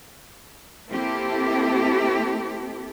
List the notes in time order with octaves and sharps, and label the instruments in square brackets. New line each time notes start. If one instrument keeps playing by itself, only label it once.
[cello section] A#3 C4 E4 G4 A4